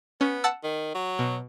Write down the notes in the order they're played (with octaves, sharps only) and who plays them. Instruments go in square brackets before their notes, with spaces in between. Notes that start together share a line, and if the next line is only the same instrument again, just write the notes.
[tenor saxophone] B3 [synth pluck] C#4
[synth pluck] F#5 A5 E6
[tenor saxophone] D#3
F#3
[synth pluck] B2